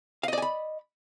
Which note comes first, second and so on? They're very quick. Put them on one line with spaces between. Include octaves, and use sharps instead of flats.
F5 D#5 D5 G#5 B5